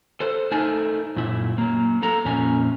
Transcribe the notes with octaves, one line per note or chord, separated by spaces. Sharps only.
A4 C5
A3 D#4 A4 A#4 G#5 A5
F#2 A#2 E4
F#3 A#3
A#3 A4 A#5
F2 A#2 A#3 C#4 G#5